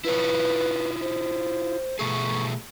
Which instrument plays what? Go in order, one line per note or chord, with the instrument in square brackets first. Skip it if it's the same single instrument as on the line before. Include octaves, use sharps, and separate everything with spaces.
[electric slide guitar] E4 F4 C#5 [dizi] B4
[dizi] C5
[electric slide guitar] B2 A3 G#4 [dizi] C#6